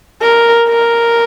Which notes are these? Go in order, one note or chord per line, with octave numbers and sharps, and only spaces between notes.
A#4
A#4